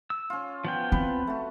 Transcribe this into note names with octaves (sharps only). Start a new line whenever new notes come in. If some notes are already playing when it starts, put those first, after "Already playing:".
E6
C#4 F4
F3 B3 G5
C4 B4
A3 F#4